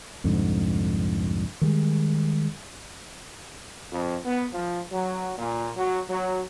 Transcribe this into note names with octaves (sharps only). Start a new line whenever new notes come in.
C2 F2 G#2 D3
D#3 G3 G#3
F2
B3
F3
F#3
A#2
F#3
F#3